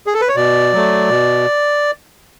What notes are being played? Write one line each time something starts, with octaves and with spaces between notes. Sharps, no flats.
G#4
A4
B4
C#5
B2 D5
F#3 A3
B2